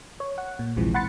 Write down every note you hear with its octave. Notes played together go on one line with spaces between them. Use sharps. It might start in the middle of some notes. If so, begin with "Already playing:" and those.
C#5
F#5
A#2
A#1 D#2 C3 E3 F3 G#3
F#5 B5 C6 A6 C#7